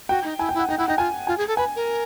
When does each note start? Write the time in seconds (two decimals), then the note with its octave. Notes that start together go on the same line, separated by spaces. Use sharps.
0.09 F#4 G5
0.24 D#4
0.39 E4 G#5
0.49 G5
0.54 E4
0.59 F#5
0.69 D#4 G5
0.78 E4 F#5
0.88 D#4 G5
0.98 F4 G#5
1.27 F4 G#5
1.38 G#4
1.48 A4
1.57 B4 G#5
1.76 A#4